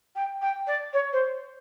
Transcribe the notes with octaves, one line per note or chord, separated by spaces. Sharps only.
G5
G5
D5
C#5
C5